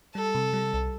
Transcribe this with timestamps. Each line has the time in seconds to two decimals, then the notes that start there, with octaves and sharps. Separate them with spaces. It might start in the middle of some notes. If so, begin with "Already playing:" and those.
0.15 G3 A4
0.35 C3
0.53 G3
0.74 C2